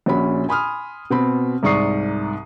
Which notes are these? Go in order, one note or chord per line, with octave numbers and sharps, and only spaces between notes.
A#1 A#2 C#4 F#4 B5
G#5 B5 C6 D#6 F6
B2 C4 B5
C2 G#2 D5 C#6 D#6 C7